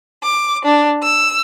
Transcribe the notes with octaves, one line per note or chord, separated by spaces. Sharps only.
D6
D4
E6